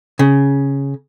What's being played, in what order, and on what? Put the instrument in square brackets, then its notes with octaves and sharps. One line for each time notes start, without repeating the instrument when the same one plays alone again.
[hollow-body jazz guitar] C#3